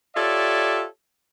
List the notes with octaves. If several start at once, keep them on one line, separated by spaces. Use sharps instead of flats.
F4 G4 A4 C#5 D5 E5